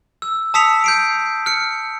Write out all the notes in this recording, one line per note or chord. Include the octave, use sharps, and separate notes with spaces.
E6
A5 D#6 E6 B6 C#7 F7
G6 C7 D7
F6 C#7